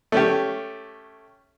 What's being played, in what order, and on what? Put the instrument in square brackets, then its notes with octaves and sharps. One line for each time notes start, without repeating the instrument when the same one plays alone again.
[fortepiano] A3 C#4 G4